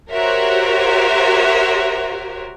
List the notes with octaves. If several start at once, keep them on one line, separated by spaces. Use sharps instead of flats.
F#4 G4 A#4 C5 C#5 E5